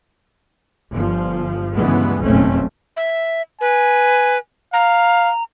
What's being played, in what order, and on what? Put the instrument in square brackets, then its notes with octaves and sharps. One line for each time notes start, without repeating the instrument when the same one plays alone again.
[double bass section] G1 F3
D2 G2 C#3 E3 G#3 B3
F#1 B1 F2 A3 C4 C#4
[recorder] E5
[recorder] B4 [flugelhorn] G#5
[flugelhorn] F5 [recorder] A#5